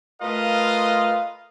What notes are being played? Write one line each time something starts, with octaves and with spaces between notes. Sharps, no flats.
A3 F4 A#4 B4 D#5 F5